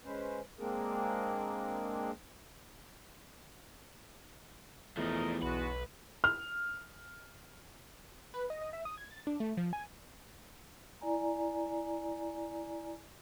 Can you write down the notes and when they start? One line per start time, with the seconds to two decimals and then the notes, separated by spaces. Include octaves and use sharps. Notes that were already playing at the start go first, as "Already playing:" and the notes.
0.05 G#3 C#4 B4 C5
0.59 G#3 A#3 C4 D4 G#4 A#4
4.97 E2 F3 A3 A#4 D#5
5.43 B1 G#3 B3 F#4 B4
6.24 F6
8.34 B4
8.50 D#5
8.61 D#5
8.73 E5
8.85 D#6
8.98 G#6
9.11 A6
9.27 D4
9.40 A3
9.57 F3
9.73 G#5
11.01 E4 D5 G#5 A#5